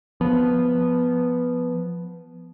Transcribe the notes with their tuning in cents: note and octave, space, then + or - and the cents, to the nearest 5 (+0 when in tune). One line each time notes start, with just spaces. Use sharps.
F3 +0 B3 +0